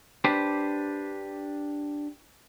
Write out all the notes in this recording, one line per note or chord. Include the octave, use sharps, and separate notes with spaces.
D4 G4 B4 C5